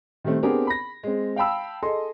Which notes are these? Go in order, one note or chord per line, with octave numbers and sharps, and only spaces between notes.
D#3 G3 A3 C4
B3 C4 D4 G4 G#4 A#4
B5 A#6
G#3 C4
F5 G5 A5 B5 E6
G#4 A4 D#5 C6